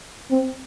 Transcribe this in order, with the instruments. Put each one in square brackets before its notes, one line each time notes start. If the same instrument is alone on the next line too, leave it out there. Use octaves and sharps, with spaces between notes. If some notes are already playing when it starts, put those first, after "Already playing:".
[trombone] C4